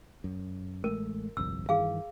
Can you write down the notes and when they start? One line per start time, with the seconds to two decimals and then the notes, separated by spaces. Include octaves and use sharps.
0.24 F#2
0.84 A1 G#3 A3 A#4
1.37 G1 C2 F2 E6
1.69 G2 D#3 E3 G#4 F5